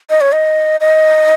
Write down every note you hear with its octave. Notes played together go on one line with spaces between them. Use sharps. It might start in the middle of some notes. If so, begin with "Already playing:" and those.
D#5
C#5
D#5
D#5